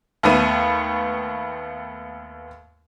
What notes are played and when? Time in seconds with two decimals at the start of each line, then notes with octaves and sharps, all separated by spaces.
0.23 D#2 A3 B3 D#7